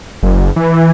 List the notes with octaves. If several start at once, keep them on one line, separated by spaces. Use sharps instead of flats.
F#1
E3